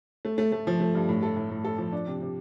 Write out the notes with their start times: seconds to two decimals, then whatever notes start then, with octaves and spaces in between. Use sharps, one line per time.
0.25 A3
0.38 A3
0.52 A3
0.67 F3
0.80 A3
0.95 G2
1.09 A2
1.23 A4
1.36 A2
1.50 A2
1.64 A4
1.78 F3
1.92 D4
2.07 C3
2.21 C3